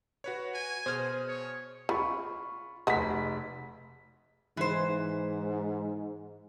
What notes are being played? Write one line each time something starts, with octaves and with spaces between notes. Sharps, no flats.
F#4 B4 C#5
G#5
B2 G#4 C5 F6
C#5
C#3 F4 B5 C#6
F1 G#3 F#4 B6
G#2 E3 C5